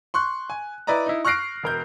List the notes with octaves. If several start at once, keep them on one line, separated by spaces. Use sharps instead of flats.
C6 C#6 F#6
G#5
E4 B4 D5 D#5 A#5
D#4 E4
C#6 F6 F#6 A#6 C7 D7
E1 A#4 G6